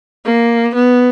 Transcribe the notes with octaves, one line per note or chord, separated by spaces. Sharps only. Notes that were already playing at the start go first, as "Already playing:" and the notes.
A#3
B3